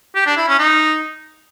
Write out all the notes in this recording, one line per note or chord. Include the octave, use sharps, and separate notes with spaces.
G4
D4
E4
C#4
D#4